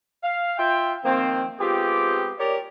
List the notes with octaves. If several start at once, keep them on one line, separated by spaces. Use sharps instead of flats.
F5
F4 E5 G5
D#3 F3 A#3 C4
G#3 B3 C4 F4 G4
G4 A#4 C#5 D5